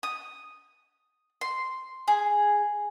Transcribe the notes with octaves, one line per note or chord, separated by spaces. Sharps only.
D#6
C6
G#4